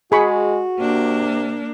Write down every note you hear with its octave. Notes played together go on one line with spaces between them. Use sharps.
G#3 F#4 G#4 B5 C#6
C3 A#3 D4